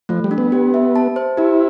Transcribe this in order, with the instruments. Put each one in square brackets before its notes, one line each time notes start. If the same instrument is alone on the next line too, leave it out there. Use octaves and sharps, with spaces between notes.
[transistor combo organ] F3 [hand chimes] A3
[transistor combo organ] G3
[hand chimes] D4
[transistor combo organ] B3
[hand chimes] G4
E5
A5
C5
[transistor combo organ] E4 [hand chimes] G4